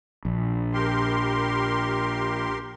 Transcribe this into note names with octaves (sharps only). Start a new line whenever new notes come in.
A#1
G4 A#4 C6